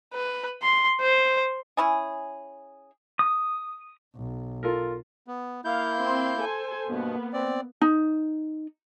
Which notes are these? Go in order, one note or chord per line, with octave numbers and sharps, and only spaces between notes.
B4
C6
C5
C#4 E4 G#4
D#6
B1
F4 A4 A#4
B3
A#3 E4 F5 G6
C4 C6
A4 C5 G#5
G2 B2 A#3 B3
C4 D5
D#4